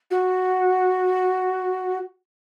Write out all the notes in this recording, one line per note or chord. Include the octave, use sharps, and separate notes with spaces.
F#4